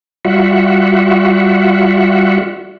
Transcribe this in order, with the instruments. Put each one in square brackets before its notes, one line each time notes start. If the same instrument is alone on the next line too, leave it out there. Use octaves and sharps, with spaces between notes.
[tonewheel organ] G3 F4 F#4 E5 F#5